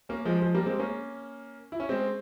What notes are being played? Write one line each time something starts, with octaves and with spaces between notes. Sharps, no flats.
A#3 C#4
F3 G#3
F3 G#3
G3 A#3
G#3 C4
A#3 C#4
E4
C#4
G#3 C4